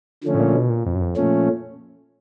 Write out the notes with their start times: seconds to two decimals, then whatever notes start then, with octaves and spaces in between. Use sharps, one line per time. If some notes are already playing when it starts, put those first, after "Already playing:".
0.24 D3 F3 A3 C#4
0.34 A2
0.39 A#2
0.54 B2
0.69 A#2
0.86 F2
0.95 F#2
1.01 F2
1.16 A#2 F3 A3 C#4